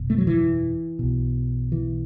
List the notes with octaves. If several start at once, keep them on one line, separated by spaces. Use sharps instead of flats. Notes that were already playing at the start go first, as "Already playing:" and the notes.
Already playing: F#1 E2 B2
A3
F#3
E3
B1 B2
E3